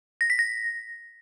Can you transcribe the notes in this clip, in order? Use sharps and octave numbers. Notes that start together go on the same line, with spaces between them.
A#6
B6
A#6